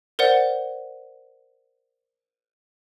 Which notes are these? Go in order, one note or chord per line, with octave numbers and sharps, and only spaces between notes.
A#4 C5 D5 F#5